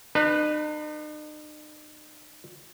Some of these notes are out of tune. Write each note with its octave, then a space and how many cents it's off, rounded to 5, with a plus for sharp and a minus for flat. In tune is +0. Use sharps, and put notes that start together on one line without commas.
D#4 -45 B4 +0